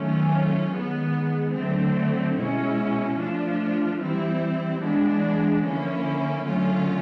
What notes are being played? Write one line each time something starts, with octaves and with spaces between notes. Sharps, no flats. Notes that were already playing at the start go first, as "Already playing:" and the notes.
Already playing: D#3 F#3 A3 C#4 F4
D#3 G#3 B3
D3 F#3 A3 C4
B2 G#3 C#4 E4
F3 A3 D4 F4
E3 G3 C4 E4
E3 G#3 B3 D4
D3 F3 A#3 C#4 E4
D3 F#3 A3 C#4 F4